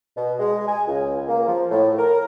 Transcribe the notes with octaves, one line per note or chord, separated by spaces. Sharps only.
B2
G#3
G#5
C#2
A#3
F3
A2
A#4